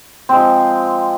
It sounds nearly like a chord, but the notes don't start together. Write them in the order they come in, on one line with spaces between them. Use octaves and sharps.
C4 G#3 F3